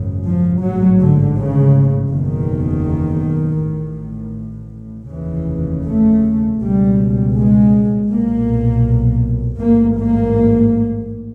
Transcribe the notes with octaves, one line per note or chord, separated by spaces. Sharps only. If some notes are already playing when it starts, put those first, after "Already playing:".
Already playing: G#1 F#2 C#3
F3
A1 G#2 F#3
D3
C#3
F#1 E2 B2 D#3
A1 A2
F1 D#2 C#3 E3
A3
C#2 B2 G3
G#3
B1 A#2 A#3
A1 G#2 A#3
A#3